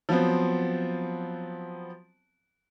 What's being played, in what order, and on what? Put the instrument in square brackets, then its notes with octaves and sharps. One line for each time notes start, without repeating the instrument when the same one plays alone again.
[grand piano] F3 F#3 B3 C4